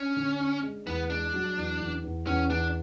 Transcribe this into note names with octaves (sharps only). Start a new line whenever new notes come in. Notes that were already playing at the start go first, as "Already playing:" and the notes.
Already playing: C#4 D4
D3
D4
G#3
E2 B3
G#3 D4
F#3
E2
E2
E2
E2 C#4
E2 D4